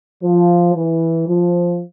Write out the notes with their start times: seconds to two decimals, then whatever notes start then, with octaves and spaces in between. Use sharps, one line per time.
0.23 F3
0.74 E3
1.27 F3